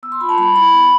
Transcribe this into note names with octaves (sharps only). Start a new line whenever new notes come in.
B3 E6
C6
F4 B5
A5
G3 B5
E4 B5
B3